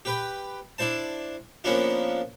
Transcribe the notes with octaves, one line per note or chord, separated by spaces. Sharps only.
G4 B4 G5
D4 E4 C5 A5
F3 A#3 B3 C#4 D4 F4